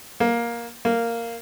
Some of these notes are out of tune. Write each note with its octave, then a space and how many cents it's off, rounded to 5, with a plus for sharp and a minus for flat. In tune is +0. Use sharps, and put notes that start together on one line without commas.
A#3 +10
A#3 -10